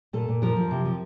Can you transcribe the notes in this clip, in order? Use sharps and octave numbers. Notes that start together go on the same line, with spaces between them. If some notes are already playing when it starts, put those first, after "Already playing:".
A#2 A4
A#2
F3 A#4
F3
C3
F3